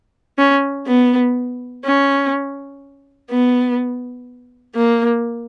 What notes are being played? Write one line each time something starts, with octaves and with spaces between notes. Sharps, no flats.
C#4
B3
C#4
B3
A#3